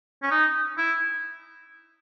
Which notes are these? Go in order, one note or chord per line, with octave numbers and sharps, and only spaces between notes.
C#4
D#4
E4